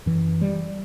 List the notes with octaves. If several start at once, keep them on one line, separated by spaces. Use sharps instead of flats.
F#2 E3
G3